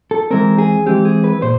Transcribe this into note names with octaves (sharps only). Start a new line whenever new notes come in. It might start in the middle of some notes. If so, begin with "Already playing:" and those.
A4
E3 G#3 C4 A#4
G#4
E3 G#3 C4 G4
G#4
B4
A#2 C5